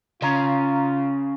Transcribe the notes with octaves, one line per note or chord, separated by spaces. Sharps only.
C#3 F4 C#5 A#5